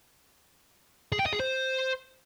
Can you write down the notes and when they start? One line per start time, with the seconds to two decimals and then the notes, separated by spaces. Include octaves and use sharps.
1.12 G#4
1.19 G5
1.26 D#5
1.33 G#4
1.40 C5